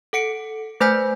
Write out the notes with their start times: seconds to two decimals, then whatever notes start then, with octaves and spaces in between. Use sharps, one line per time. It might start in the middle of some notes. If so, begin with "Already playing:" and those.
0.13 A4 F#5 C#7 D7
0.81 A3 B4 C5 G#5 G6 B6